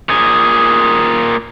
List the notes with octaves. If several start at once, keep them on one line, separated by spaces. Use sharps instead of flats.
A#2 G#4